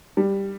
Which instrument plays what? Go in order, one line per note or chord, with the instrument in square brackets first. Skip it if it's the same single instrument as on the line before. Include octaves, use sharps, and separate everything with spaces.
[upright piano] G3